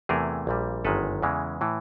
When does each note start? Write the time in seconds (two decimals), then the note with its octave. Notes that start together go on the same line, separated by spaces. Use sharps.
0.09 E2 C3 E3 A3 G#4 A#4
0.47 A#1 A#2 G3
0.85 G1 F#2 D#3 G#3 A4 B4
1.22 E2 C#3 E3 G#3
1.61 A2 E3